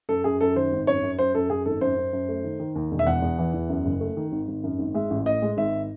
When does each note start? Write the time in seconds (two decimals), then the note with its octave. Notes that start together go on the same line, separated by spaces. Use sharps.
0.09 F#2 A4
0.24 F#2 G#4
0.41 F#2 A4
0.55 D#3 C5
0.72 G#1
0.87 F#2 C#5
1.03 F#2
1.19 F#2 C5
1.35 F#2 A4
1.50 F#2 G#4
1.65 G#1 A4
1.81 F#2 C5
1.97 F#2
2.13 F#2
2.28 A3
2.44 D#3
2.60 D#3
2.75 D#2
2.91 E1
2.99 E5
3.07 E2 F#5
3.22 E2
3.39 E3
3.54 E2
3.69 F#2
3.85 F#1
4.00 A3
4.17 D#3
4.32 G#1
4.48 G#1
4.63 F#2
4.79 G#1
4.94 G#3 E5
5.10 A1
5.26 A2 D#5
5.42 G#3
5.57 G#1 E5